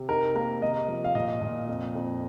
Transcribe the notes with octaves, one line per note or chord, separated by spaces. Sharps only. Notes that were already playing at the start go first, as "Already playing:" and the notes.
Already playing: C3
D#4 A#4
A#3 A#4
C3 D#5
F3
F5
A#2 D#5
A#2
F2
F2